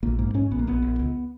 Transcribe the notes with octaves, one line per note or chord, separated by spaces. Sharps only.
A#1 A#3
G#2 A#3
G#2 C#4
A#1 B3
A#3
A#1 B3
A#1
C#2